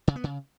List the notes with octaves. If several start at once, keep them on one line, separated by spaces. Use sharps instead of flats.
C#3
B3
C#3